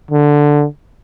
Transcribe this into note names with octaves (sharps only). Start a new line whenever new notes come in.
D3